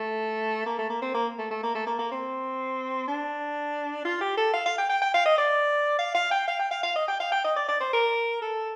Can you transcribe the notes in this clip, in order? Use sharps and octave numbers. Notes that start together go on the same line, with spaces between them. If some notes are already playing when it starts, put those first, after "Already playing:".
Already playing: A3
A#3
A3
A#3
C4
A#3
A3
A3
A#3
A3
A#3
A#3
C4
D4
F4
G4
A4
F5
F5
G5
G5
G5
F5
D#5
D5
F5
F5
G5
F5
G5
F5
F5
D#5
G5
F5
G5
D#5
D5
D5
C5
A#4
A4